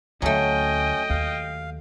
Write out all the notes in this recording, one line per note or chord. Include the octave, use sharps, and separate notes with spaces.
D2 F#3 A3 C#4 D#5 G5
D#2 F5